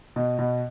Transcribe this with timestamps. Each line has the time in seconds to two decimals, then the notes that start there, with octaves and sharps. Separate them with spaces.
0.16 B2
0.39 B2